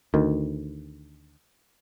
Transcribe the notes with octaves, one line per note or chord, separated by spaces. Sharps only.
D2 D#3